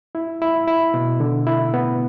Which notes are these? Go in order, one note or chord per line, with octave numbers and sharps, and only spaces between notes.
E4
E4
E4
B2
D3
E4
B3